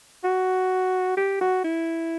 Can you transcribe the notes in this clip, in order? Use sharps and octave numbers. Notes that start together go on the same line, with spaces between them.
F#4
G4
F#4
E4